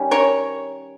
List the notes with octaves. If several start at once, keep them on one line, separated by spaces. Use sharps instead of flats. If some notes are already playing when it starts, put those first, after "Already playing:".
Already playing: D#3 G3 C#4
A#4 C#5